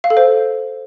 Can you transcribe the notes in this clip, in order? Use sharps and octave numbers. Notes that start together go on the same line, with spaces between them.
F5
A4
C5